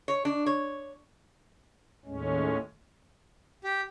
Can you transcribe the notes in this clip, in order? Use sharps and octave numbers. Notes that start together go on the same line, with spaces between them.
C#5
D4
C#5
D#2 A2 G#3 C#4
G4